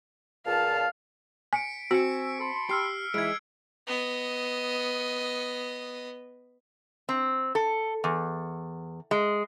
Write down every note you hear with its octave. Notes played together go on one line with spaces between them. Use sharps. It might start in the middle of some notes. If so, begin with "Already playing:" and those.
C#2 A#2 F5 A5
G#5 B6 C#7 D7
C4 F#4 G#5 C#6 E6 B6 C#7
A5 B5 C6
G4 E6 F6 C7
G#2 E3 G#3 E4 G#6 D7
B3 D#5
C4
A4
E2
G#3